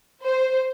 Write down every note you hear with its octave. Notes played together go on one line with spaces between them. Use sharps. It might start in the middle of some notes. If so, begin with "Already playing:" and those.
C5